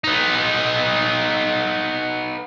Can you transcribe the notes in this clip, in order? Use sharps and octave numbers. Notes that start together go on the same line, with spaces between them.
B3 D#4